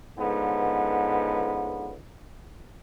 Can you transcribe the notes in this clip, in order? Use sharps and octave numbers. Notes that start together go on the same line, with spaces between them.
C#2 G#2 D3 B3